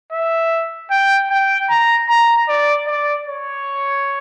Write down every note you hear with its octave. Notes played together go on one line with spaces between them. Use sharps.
E5
G5
G5
A#5
A#5
D5
D5
C#5